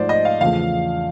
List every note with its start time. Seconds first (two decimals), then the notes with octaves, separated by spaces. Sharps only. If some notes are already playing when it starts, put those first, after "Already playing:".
Already playing: G#2 F3 A3 C5 D5
0.09 D#5
0.25 F5
0.41 E2 C#3 F3 A3 F5